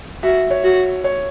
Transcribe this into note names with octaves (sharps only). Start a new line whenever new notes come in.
F#4 E5
C#5
F#4
C#5